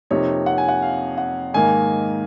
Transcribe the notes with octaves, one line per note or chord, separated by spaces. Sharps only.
F2 C3 F3 A#3 D#4 C#5
F#5
G#5
F#5
F5
F#5
G#2 D#3 A#3 G#5